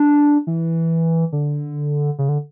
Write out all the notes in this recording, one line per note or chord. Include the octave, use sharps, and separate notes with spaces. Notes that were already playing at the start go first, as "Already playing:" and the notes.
Already playing: D4
E3
D3
C#3
D3